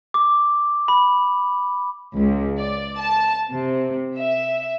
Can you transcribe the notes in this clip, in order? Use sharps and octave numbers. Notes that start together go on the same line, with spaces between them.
D6
B5
C#2
D5
A5
C3
E5